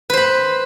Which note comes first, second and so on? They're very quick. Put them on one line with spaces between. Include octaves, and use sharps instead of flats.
B4 C5 B5